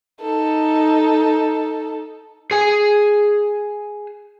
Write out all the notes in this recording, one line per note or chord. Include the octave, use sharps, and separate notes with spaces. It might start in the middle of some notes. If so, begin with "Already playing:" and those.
D#4 A4
G#4 G#5